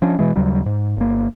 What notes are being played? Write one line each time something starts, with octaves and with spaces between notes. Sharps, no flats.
F3 C#4 D4
B2 E3 G#3
D#2 C#3 F#3 G3
G#2
G1 A#3